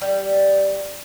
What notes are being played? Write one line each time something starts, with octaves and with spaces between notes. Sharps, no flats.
G3